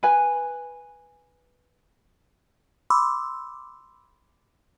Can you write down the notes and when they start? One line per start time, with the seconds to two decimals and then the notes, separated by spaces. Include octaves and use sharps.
0.03 B4 G#5
2.90 B5 C6 D6 E6